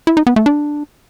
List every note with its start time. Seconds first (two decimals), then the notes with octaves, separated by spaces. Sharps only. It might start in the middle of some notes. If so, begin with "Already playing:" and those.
0.07 E4
0.17 D#4
0.27 B3
0.36 A3
0.46 D4